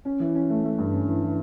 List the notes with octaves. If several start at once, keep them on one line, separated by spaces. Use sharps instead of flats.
C#4
E3
C#4
A3
A3
G2
C#4
E3
E3